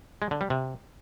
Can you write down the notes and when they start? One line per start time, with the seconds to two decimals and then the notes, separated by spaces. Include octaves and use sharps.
0.22 G#3
0.31 D3
0.41 G3
0.50 C3